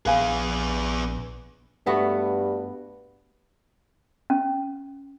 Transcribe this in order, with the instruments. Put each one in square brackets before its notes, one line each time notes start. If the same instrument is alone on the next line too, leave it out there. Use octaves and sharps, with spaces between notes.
[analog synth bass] A#1 [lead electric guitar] B3 G#4 [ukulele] B4 F5 G#5
[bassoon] G2 [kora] A3 B3 F#4
[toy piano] C#4